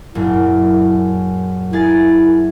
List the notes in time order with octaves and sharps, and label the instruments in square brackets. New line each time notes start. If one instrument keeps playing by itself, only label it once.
[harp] F#1 A#2 [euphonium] E4
[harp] A#3 G#4 A6 [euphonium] E4